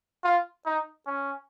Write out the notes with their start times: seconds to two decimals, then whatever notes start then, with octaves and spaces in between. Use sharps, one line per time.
0.24 F4
0.66 D#4
1.07 C#4